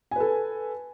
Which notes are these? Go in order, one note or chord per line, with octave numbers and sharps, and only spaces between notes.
A4 B4 G#5